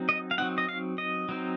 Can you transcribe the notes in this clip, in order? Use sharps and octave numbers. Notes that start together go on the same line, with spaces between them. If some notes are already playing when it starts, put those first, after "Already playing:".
Already playing: F#3 C4 D#4
D#5
F5
F#3 C4 D#4 F#5
D#5
F5
D#5
F#3 C4 D#4